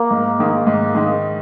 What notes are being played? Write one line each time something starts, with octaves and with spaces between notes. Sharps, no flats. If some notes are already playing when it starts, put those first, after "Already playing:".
Already playing: A#3
G#2
D#3 G#3
G#2
D#3 G#3